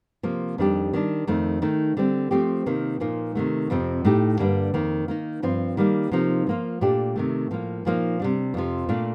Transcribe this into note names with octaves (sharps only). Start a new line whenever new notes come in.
C3 F3 A#3
F2 D#3 G3 D4 G4
D#3 G3 D4
F2 D#3 A3
D#3 A3 D#4
D3 G3 C4
F3 A3 C4 G4
C3 D#3 A#3
A#2 F3 A#3 D#4
C3 D#3 A3
F2 C3 F3 C4
A2 A3 D#4 G4
G2 D3 G3 A#3 D4
F2 D#3 A#3
D#3 A#3 D#4
G2 F3 C4 F4
D#3 G3 A#3
C3 F3 A#3 D#4
F3 A#3 F4
A#2 A3 D4 G4
C3 D#3 A3
A2 F3 A#3
A#2 F3 A#3 D#4
C3 G3 D4
F2 C3 F3
A#2 A3 D4 F4